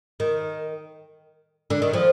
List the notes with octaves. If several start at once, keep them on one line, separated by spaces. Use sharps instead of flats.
D#3
D3
D#3
F3